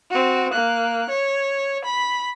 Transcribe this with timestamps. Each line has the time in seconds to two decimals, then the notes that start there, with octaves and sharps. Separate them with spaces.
0.11 C4 F#4
0.53 A#3 F#6
1.10 C#5
1.85 B5